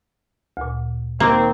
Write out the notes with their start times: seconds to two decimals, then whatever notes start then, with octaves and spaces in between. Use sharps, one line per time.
0.57 D2 A#2
1.20 D#3 A#3 C4